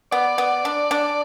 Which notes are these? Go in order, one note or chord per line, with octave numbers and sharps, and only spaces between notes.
B3 D5
B3
D4
D4